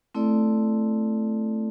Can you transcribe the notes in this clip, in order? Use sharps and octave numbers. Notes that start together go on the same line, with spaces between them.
A3 C4 E4 A4 D5